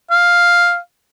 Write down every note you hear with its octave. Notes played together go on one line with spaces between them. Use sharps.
F5